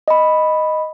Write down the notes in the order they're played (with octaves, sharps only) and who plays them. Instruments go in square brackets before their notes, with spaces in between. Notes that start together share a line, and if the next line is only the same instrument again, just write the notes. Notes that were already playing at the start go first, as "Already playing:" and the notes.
[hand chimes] D#5 B5